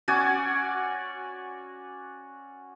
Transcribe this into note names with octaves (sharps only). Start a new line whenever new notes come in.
C#4 F#4 D5 G#5